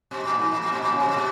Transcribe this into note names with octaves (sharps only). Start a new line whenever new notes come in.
B2
A#2
G#2
A#2
A#2
B2
A#2
C#3
B2
A#2
B2